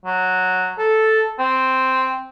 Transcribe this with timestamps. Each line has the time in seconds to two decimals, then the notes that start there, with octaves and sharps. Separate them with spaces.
0.05 F#3
0.78 A4
1.39 C4